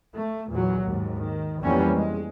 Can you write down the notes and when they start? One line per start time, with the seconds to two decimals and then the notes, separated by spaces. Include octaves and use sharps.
0.15 A3
0.51 E2 A#2 F#3
0.82 D#2 G#2
1.18 D#3
1.63 F2 E3 G3 A#3 B3 C#4
1.95 G#3